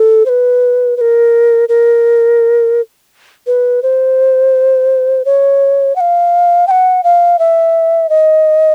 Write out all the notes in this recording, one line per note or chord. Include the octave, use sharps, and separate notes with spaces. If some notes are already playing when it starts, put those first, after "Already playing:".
Already playing: A4
C5
B4
B4
A#4
A#4
B4
C5
C#5
F#5
F5
G5
F#5
F5
E5
D#5